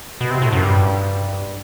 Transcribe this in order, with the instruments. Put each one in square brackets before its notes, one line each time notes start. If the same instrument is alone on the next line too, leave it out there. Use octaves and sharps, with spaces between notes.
[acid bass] B2
C3
A2
F#2
G2